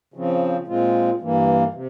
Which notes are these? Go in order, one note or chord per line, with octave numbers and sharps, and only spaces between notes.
C#3 F3 C4
A#2 G#3 C4 F4
G2 E3 A#3
C3